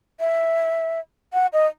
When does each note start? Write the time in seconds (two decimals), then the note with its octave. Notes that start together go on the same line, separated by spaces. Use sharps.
0.20 E5
1.33 F#5
1.53 D#5